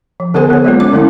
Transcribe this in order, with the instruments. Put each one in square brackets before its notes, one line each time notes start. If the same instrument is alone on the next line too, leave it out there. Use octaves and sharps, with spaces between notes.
[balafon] F3
D3 B3 G#4 A#4 C5 G#5
B3 C#5
F#3 G#3 A#3 B3 F4
C#4 D6
D3 F#3 A3 A#3 C#4 E4